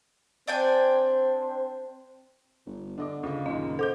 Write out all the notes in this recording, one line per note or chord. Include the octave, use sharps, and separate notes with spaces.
C4 D4 C5 G5 G#5
G1
D3 D4 D#5 D6
C#2 C#3 D#5
F#2 A#2 D#3 D#5
A4 C5 D6 G6